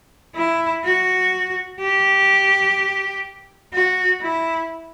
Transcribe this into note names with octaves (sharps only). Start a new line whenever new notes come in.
E4
F#4
G4
F#4
E4